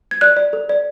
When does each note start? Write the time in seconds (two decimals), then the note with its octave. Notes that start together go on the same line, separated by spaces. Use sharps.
0.11 G#6
0.21 D5 F#6
0.37 D5
0.53 A4
0.69 D5